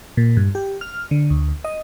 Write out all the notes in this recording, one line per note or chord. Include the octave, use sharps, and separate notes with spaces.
A#2
G2
G4
F6
D3
D2
D#5